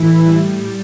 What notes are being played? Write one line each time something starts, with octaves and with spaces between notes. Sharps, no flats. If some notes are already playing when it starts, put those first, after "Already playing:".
Already playing: A2 E3 E4
G3